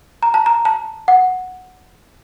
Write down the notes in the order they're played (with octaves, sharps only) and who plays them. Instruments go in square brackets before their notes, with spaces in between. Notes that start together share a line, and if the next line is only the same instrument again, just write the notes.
[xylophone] A#5
A5
A#5
A5
F#5